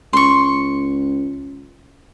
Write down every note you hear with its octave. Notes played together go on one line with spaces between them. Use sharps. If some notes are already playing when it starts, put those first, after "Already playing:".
C#2 C6 C#6